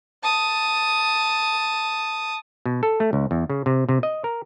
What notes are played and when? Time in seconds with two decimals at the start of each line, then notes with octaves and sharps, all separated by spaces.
0.23 A5 D#6
2.66 B2
2.83 A4
3.00 A3
3.13 C#2
3.31 E2
3.50 C#3
3.66 C3
3.89 C3
4.03 D#5
4.24 A#4